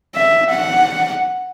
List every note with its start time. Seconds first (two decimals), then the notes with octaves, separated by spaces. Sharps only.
0.15 E5
0.50 F#5